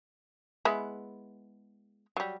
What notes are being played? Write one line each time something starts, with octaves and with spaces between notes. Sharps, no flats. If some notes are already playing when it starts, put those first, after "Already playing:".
G#3 B3 E4
F#3 G3